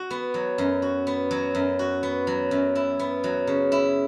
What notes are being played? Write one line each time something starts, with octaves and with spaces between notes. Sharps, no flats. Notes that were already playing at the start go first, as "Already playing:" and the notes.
Already playing: F#4
B3
F#3
F#2
F#4
B3
F#3
F#2
F#4
B3
F#3
F#2
E4
B3
F#3
C#3
E4